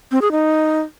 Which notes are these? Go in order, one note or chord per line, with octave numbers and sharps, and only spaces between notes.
C4
G#4
D#4